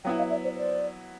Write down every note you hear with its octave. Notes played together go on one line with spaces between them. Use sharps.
F#3 B3 E4 F5 G5
D#5 F5
D5 E5
C5 D5
C5 D5